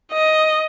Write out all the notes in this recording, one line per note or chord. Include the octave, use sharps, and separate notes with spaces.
D#5